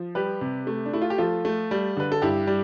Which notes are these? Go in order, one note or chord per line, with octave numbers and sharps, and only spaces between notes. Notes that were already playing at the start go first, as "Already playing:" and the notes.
Already playing: F3
G3 G4 B4
C3
A3
D4
A3 E4
F4
G4
F3 F4 A4
A3
G3
D3 B4
A4
G2 E4 G4
G3